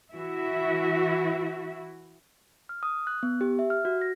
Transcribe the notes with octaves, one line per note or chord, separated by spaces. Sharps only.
E3 E4 F#4 E5
F6
D#6
F#6
B3
G4
E5
F6
F#4
A#6